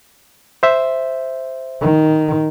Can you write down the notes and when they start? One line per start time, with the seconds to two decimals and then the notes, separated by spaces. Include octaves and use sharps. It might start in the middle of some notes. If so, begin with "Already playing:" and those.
0.63 C5 E5
1.81 D#3